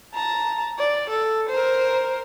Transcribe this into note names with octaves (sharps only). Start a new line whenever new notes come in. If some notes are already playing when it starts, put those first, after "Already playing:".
A5 A#5
D5
A4
A#4 C5